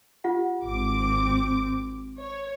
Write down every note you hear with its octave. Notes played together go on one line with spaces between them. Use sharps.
F4 G4 F#5
G#1 C4 D6
C#5